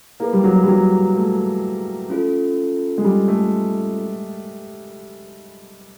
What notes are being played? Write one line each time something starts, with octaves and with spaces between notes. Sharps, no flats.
A#3 E4 G#4 B4
G3
F#3
G3
F#3
A3
C#4 F4 A4
G#3
G3
A3